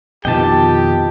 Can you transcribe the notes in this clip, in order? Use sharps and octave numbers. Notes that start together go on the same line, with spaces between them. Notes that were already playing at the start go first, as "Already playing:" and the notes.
F2 B2 D#3 F4 G4 D#5 G5 A5